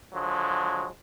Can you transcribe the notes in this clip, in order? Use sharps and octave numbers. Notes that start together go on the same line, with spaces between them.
D3 F3 F#3 G#3